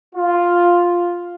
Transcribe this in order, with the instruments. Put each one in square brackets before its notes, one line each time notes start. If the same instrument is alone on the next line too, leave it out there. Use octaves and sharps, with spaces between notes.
[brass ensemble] F4